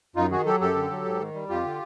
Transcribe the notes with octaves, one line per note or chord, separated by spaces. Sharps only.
F#2 D#4 F4
D#3 F#4 G#4
F#3 G4 A4
F#2 G4 A4
D3
F#3
G#2
D#3
G3
F2 F4 G4
D3